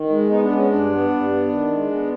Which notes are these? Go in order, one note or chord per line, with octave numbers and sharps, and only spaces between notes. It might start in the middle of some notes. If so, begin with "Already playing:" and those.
Already playing: D#3
G#3
B3 D#4
D4
G#3
C#4
G2 D4
B3
G2
B3
D#3
G#3
B3